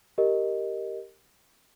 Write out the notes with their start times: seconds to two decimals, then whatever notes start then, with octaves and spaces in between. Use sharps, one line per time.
0.18 G4 A#4 D#5